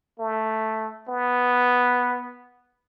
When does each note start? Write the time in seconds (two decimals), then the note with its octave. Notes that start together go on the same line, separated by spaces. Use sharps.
0.19 A3
1.08 B3